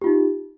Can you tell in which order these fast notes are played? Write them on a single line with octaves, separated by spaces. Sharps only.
G4 F4 D#4